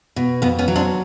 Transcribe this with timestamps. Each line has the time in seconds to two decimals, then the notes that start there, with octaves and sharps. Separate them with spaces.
0.16 B2
0.42 F2 B3
0.59 B3 C#4
0.68 F#3
0.75 C4 D4